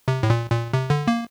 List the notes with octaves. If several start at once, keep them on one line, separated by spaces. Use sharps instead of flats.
C3
A2
A#2
A#2
C3
D3
A#3